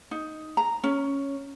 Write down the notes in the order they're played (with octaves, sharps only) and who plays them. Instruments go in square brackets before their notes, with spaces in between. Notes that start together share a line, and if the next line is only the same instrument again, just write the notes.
[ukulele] D#4
A#5
C#4